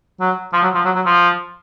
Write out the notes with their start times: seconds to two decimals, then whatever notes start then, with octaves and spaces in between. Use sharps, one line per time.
0.20 F#3
0.53 F3
0.63 F#3
0.75 F3
0.85 F#3
0.96 F#3
1.06 F3